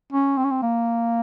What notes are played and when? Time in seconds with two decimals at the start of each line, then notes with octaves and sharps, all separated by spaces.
0.12 C#4
0.37 C4
0.44 C#4
0.51 C4
0.62 A#3